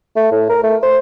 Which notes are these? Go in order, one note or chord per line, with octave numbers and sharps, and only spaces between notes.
A3
A2
A#4
A3
C5